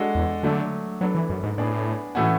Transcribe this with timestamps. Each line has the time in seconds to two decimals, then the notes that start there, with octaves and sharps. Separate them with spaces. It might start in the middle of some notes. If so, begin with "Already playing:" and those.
Already playing: G#3 D4 F#4 A4
0.15 E2
0.43 D3 F#3 A3 D4
1.01 F#3 B3 D4 A4
1.15 E3
1.29 F#2
1.43 G#2
1.58 A2 B3 D4 G#4 D5
2.15 A2 E3 A3 C#4 F#4